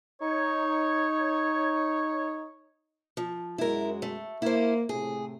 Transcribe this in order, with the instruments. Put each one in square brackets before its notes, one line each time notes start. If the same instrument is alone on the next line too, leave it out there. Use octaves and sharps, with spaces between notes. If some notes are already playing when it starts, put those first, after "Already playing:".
[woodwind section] D#4 C#5
[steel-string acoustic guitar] F3
[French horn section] F#2 G#3 F#4 [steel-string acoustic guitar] E4 A#4
[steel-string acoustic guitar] A3
[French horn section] A#3 [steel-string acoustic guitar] E4 C5
[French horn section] A2 C3 A3 [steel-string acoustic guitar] G#4